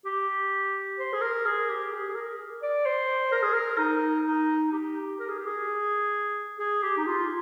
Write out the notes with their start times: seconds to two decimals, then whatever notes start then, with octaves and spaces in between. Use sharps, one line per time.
0.05 G4
0.99 C5
1.13 G#4
1.21 A#4
1.46 G#4
1.69 G4
1.92 G#4
2.09 G#4
2.15 A#4
2.63 D5
2.86 C5
3.32 A#4
3.43 G#4
3.53 A#4
3.78 D#4
4.26 D#4
4.72 G4
5.20 A#4
5.29 G#4
5.38 G4
5.46 G#4
6.59 G#4
6.83 G4
6.98 D#4
7.06 F4